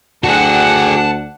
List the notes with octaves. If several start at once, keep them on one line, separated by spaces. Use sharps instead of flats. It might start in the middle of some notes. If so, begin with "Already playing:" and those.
D2 D4 F#4 G#4 F#5 A5